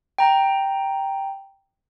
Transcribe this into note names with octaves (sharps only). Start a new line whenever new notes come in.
G5 A#5